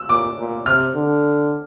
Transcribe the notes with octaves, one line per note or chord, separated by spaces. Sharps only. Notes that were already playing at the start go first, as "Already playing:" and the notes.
Already playing: E6
A#2 D6
A#2
C3 F6
D3